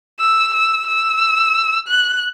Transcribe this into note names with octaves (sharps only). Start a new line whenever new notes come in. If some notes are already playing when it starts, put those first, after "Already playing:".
E6
E6
E6
F#6